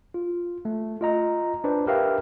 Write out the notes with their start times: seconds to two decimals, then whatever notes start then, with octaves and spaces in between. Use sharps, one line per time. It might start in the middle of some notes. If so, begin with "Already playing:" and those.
0.14 F4
0.65 A3
1.01 F4 D#5 A#5
1.64 D4 B4 C5
1.87 G4 A#4 B4 E5 F5 G5